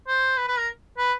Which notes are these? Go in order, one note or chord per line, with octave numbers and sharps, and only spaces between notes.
C5
B4
B4
A#4
B4